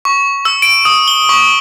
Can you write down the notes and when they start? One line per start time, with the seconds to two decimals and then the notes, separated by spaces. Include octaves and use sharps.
0.05 C#6
0.45 E6
0.62 D7
0.85 D#6
1.08 G7
1.29 C#6